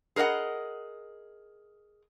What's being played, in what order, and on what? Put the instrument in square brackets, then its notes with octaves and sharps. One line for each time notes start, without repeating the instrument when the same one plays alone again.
[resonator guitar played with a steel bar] G#4 A#4 C#5 D#5 F#5